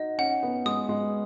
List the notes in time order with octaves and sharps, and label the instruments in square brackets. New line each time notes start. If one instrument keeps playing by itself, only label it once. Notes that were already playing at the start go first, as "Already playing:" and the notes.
Already playing: [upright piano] D#4 F#4 [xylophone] D#5
[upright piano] C#4 [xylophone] F#5
[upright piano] B3
[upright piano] G#3 [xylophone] D#6
[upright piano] G#3